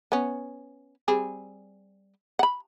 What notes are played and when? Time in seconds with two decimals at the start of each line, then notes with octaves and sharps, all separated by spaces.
0.12 B3 C#4
1.08 G3 C4 G#4
2.39 F#5 B5